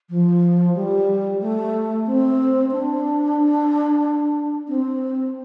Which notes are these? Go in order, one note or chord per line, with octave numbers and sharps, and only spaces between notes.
F3
G3
A3
C4
D4
C4